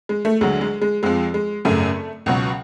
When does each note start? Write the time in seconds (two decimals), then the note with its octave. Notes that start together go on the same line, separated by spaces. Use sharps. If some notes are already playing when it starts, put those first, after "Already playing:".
0.09 G#3
0.25 A3
0.41 D2 D3 F#3 G#3
0.61 G#3
0.82 G#3
1.03 F2 F3 G#3
1.34 G#3
1.65 G#1 F#2 C#3 A3
2.26 C#2 B2 F#3